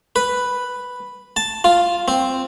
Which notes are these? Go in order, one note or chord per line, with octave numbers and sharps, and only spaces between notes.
B4
A5
F4
C4